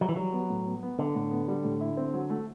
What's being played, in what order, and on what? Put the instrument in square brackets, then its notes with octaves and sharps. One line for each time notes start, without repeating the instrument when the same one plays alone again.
[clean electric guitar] F#3 [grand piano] G3
[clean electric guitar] E3
[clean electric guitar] F#3 [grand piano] G3
[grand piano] B3
A2
B3
B3
[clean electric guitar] D3 [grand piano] B3
[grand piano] A2
B3
G3
A2
E4
C4
F#3
A3